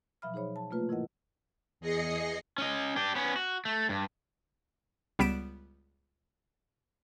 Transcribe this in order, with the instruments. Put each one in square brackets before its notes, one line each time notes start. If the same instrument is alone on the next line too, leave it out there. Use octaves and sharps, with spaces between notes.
[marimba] B2 F3 F#3 E5 B5 F6
D#4 G#4 C5 C#5 B5
A5
C3 A3 A#3 F4 B4
G#2 E3 E4 A#4 D#5 F#5
[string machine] E2 G#4 D#5 A#6 C7 C#7
[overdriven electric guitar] C#4 D#5
D4 G4
B3 C#4
F#4
A3
G2
[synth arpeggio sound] C#2 G3 B3 B6 D7 E7